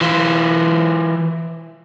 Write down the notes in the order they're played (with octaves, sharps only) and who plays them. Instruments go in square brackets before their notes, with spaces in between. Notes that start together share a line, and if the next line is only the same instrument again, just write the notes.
[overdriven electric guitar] E3 F4